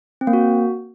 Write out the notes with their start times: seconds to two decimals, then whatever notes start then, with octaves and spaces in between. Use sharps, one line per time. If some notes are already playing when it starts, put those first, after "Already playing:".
0.21 C4
0.27 A#3
0.33 F#4